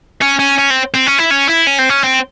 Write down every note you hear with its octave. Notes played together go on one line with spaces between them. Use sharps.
C#4
C#4
C#4
C4
C4
C#4
E4
C#4
E4
C#4
C4
C#4
C4